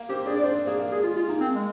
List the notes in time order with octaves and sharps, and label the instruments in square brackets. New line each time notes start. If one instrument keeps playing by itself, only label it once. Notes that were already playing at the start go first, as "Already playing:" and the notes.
Already playing: [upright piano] A#3
[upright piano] C4 [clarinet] G4
[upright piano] D4 [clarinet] G#4
[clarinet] D5
[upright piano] D4 [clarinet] C5
[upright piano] C4
[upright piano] A#3 [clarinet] G#4
[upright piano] A#3
[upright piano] G#3 [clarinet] G#4
[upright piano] G#3 [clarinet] F4
[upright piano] G#3 [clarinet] F4
[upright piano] A#3 [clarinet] D#4
[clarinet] C4
G#3